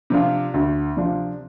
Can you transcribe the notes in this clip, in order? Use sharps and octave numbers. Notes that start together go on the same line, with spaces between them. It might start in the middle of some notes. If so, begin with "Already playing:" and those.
C3 F3 D4 F4
D2
C3 F3 D4 F4